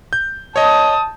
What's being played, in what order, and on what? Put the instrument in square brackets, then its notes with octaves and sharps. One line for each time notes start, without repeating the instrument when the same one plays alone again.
[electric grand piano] G6
[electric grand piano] C#5 D#5 [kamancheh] A5 D#6